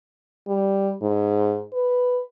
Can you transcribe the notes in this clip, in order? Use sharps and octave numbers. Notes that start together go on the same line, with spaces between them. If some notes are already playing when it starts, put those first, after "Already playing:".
G3
G#2
B4